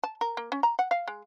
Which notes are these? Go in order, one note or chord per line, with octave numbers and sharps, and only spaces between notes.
A5
A#4
A#3
C#4
A#5
F#5
F5
G#3